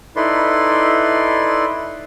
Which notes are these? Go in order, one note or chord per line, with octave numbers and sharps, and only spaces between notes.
D#4 E4 A4 B4 D5 C6